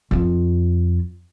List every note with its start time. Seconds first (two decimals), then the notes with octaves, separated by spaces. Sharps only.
0.11 F2 F4